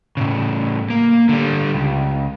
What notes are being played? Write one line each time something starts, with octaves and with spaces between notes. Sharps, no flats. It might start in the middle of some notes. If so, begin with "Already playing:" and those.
A2 C#3
A#3
D3 G3
C#2